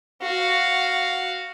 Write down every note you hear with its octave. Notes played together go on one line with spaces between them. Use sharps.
F#4 F5